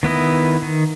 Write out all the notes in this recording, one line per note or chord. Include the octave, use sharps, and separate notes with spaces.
D#3 B3 E4 D#5
D#3